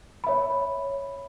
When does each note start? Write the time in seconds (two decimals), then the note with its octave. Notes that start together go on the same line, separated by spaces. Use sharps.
0.24 C#5 E5 B5